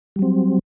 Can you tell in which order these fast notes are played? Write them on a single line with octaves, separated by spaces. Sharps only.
G3 F#3 C4